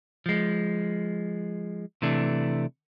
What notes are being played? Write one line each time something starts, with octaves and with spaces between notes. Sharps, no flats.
F3 G#3
C3 E3 A3 D4